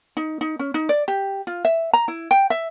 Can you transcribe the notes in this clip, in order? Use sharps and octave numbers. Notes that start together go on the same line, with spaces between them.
D#4
D#4
C#4
D#4
D5
G4
F4
E5
A#5
E4
G5
E5